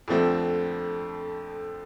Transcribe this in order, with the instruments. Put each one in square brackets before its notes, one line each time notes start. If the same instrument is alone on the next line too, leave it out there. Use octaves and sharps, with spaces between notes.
[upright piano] F2 D3 F3 A3 C4